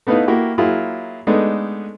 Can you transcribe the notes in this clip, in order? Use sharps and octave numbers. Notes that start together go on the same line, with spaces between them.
A3 B3 D#4 E4 B4 F5
A#3 E4 F#4 G4
F#3 A#3 E4 F4 G#4
G#3 A3 B3 D4 D#4